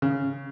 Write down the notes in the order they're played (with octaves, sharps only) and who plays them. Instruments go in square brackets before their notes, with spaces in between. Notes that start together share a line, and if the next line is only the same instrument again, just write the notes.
[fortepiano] C#3